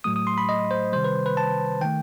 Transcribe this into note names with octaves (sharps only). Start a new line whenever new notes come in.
A2 F#3 A3 D#6
D#6
C6
B5
D#5
C5
C3 D#3 G3 C5
B4
B4
A5
D#3 A3 G5